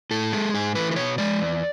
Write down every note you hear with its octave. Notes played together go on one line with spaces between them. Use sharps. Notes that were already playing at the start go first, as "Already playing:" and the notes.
A2 A4
G#3
G#2 G#4
E3 A3 B4
B4
B2 C#5
G#3 D5
E2